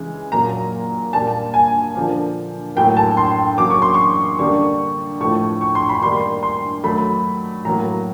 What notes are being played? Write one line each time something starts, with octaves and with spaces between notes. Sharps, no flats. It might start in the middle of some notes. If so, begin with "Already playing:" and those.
Already playing: C#3 E3 G#3
A#2 F#3 A#3 A#5
A#2 G3 A#3 A5
G#5
D3 F3 A#3
A2 F#3 A#3 G5
A5
C6
C#3 F#3 A#3 D6
C#6
C6
C#6
D3 G3 A#3 C#6
A2 F3 A3 C#6
C#6
C6
B5
D#3 G3 A#3 C6
C6
D#3 F#3 A3 B5
A2 F#3 A#3 A#5